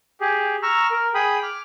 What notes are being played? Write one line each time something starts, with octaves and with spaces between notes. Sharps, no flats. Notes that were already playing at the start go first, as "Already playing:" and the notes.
G4 G#4
A#5 C#6 E6 F6
A#4
G#4 G5 B5 D#6
D6 F6